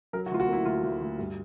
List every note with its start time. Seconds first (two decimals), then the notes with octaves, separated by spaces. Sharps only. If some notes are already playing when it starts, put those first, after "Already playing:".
0.13 F#3 A#4
0.26 F#4
0.31 D2 F4
0.40 F#4
0.48 A#3 E4
0.65 D2 F4
0.83 D2
1.01 D2
1.19 G2